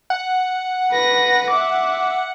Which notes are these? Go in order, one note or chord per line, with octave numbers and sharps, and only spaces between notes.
F#5
B4 A#6
E5 D6